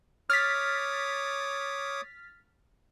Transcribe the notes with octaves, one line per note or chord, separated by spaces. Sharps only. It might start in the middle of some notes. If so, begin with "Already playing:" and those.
C#5 D6 D#6 F6 A6 B6